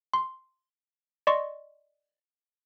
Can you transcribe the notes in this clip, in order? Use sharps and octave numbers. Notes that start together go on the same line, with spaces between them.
C6
D5 D#5 C6 C#6